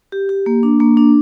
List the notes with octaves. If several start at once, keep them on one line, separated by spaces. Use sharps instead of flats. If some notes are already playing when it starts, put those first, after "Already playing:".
G4
G4
A#3
D4
A#3
D4